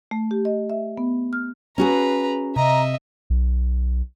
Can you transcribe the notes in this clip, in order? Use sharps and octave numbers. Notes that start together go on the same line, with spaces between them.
A3
G4
D#5
E5
B3
F6
C#4 F#4 G#4 B4 A#5
C3 D#5 E5 A#5
B1